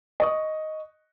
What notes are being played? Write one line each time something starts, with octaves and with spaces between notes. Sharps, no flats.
D#5 C#6 D#6